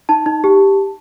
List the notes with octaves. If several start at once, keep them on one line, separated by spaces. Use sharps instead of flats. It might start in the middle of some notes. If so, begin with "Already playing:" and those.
D#4 A5
D#4
G4